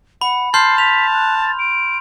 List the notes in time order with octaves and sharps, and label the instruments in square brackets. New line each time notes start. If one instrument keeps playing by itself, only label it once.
[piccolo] F#5 [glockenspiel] B5
[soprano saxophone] A5 [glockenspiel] C6 F6 G6 [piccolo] C7
[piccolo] B6 [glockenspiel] F7
[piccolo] F#6
A6
D7